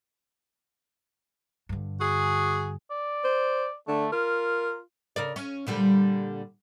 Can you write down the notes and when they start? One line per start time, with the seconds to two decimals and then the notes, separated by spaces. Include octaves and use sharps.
1.69 G2 D3
2.01 F#4 G#4
2.90 D5
3.24 C5
3.88 D3 A3
4.12 F4 A#4
5.16 C#3 A#4 D5
5.36 C#4
5.67 A#2 D3 G3